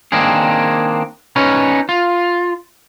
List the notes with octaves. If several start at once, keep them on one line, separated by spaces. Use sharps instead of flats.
D#3 A#3 C4 D4 G#4
C#4 D#4 B4 C#5
F4